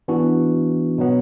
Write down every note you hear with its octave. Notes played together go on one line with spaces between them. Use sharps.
E3 B3 D4 F#4
B2 F#3 B3